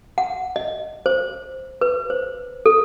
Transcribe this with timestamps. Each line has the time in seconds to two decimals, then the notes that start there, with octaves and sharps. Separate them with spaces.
0.18 F#5
0.56 D#5
1.06 C5
1.81 B4
2.10 C5
2.66 A4